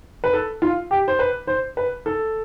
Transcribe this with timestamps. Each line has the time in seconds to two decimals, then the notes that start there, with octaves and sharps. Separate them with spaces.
0.24 B4
0.33 A4
0.62 F4
0.91 G4
1.08 C5
1.19 B4
1.47 C5
1.77 B4
2.06 A4